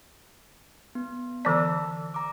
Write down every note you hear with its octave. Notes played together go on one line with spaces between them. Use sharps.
B3
D3 E3 D5 A5 E6
A#5 D6